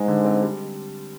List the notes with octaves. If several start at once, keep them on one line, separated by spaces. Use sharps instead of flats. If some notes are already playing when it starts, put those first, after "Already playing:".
Already playing: G#2 G#3
D3
C4
G3